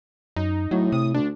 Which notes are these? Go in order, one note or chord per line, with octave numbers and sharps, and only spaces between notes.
F#2 D#4
A2 F#3
C3 D#6
D2 D4